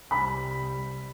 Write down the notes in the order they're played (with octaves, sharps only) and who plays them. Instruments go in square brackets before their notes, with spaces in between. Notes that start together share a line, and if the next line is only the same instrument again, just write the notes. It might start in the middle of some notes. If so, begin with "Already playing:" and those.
[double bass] C2 G3 [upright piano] B5